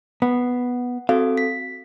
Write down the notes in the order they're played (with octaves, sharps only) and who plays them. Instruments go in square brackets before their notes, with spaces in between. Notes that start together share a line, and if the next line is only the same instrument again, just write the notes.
[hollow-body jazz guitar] B3 [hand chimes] F#5
[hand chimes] C4 F#4 A4 [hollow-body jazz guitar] F5
[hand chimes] B6